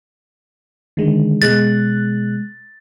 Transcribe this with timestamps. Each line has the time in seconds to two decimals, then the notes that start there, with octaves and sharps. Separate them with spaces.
0.97 D3 D#3 G#3
1.42 B2 G#3 F#6 A6